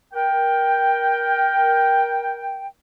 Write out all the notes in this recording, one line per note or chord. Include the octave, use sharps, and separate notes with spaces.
A#4 G5